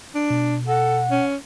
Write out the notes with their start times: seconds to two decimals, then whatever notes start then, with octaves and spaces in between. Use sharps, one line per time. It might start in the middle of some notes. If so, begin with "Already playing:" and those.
0.15 D4
0.30 B2
0.67 A4 F#5
1.11 C#4